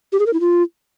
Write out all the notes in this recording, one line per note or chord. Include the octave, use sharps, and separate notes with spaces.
G4
G#4
A#4
E4
F4